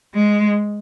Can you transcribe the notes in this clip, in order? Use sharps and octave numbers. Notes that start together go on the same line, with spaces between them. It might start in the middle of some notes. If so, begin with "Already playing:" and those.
G#3